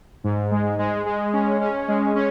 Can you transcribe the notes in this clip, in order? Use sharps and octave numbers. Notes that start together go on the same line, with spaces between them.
G#2
G#3
G#3
G#3
C#4
C#4
G#3
C#4